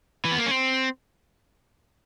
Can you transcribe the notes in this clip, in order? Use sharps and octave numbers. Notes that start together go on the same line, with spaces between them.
E3
B3
A#3
C#4
C4